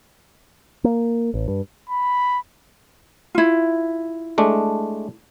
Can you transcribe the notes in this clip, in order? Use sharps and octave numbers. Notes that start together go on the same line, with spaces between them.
A#3
A1
G2
B5
E4 F4
G#3 A3 D4